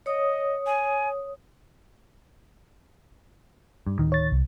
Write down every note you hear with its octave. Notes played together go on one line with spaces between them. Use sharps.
C#5 D#5 D#6
G#5
G2
D1 D#3
C#5 A6
C2